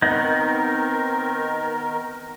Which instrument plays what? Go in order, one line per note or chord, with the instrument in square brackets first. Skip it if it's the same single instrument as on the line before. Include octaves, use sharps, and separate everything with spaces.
[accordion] D#3 A#4 [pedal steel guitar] B3 D#4 [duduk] C4